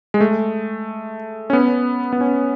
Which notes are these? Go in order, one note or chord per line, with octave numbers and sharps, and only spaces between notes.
G#3
A3
C#4
B3
B3
C#4